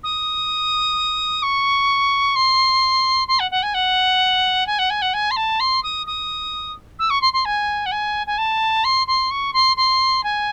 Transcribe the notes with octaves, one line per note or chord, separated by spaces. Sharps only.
D#6
C#6
C6
C6
F#5
F#5
G#5
F#5
G#5
F#5
G#5
F#5
G#5
C6
A5
C6
D#6
D#6
E6
C#6
C6
C6
G#5
F#5
G#5
G#5
A5
C6
C6
C#6
C6
C6
G#5